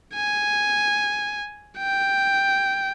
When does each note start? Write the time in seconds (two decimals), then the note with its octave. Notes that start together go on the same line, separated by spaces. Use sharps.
0.15 G#5
1.78 G5